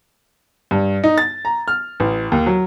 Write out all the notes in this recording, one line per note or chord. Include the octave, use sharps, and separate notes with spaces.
G2
D#4
A6
A#5
F6
A1
D#2
F#3